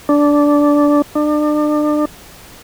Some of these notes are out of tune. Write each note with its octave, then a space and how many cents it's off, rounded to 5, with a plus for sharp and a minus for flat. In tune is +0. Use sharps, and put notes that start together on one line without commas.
D4 -10
D4 +35